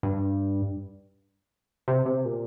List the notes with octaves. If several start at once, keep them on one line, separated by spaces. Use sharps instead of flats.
G2
C3
C3
A#2